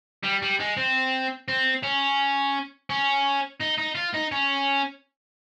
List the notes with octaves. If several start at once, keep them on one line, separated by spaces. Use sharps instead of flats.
G3
G3
G#3
C4
C4
C#4
C#4
D#4
D#4
F4
D#4
C#4